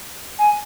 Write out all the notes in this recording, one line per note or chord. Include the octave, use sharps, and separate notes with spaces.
G#5